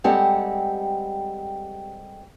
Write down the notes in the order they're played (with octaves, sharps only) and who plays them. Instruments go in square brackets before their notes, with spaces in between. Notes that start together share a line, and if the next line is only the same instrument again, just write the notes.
[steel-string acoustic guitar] G3 G#3 C4 G4 A4 F#5